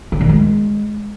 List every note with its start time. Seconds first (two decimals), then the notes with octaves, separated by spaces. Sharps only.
0.12 D3
0.21 D#3
0.29 G#3